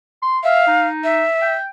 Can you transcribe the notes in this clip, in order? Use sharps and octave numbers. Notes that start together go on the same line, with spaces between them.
C6
E5 F5
D#4
E5
G5